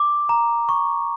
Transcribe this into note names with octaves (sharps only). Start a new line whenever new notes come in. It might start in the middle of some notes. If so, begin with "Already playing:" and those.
Already playing: D6
A#5
C#6